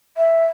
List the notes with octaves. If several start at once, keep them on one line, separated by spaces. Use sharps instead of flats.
E5